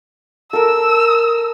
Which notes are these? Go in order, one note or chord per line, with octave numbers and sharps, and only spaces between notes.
A4 A#4 E6